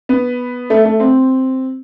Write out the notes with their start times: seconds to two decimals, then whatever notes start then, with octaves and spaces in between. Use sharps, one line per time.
0.09 B3
0.70 A3
0.85 A3
1.00 C4